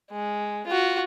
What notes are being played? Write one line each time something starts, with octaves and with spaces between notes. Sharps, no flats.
G#3
F4 F#4